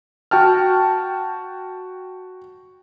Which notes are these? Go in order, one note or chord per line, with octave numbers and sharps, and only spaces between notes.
F#4 G5 A5 F6